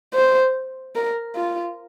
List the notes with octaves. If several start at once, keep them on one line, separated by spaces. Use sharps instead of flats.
C5
A#4
F4